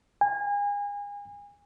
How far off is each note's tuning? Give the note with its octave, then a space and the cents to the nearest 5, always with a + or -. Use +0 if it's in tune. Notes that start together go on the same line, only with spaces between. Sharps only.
G#5 -35